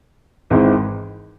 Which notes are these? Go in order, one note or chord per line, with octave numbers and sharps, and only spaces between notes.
G#1 G#2 E3 G#3 C4